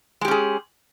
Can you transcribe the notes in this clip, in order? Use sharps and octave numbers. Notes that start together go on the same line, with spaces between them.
G#3 C#4 G4 G#4